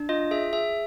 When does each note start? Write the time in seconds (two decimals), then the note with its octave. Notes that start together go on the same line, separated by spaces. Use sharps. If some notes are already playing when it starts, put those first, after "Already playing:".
Already playing: D4
0.09 F4 D#5
0.31 G#4 E5
0.53 G#4 E5